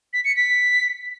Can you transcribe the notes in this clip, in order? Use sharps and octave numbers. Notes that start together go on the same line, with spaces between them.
B6
C#7
B6